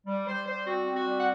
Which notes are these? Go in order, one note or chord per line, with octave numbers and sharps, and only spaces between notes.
G3
G3 C5
G3 C5
C4 F#4
C4
F#4
G3
F#5